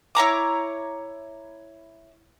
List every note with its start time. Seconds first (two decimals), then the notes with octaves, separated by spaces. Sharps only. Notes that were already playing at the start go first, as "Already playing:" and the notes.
0.15 E4 C#5 A#5 D6